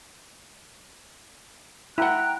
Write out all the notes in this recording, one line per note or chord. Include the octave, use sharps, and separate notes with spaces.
E4 F#5 G5 A#5 F#6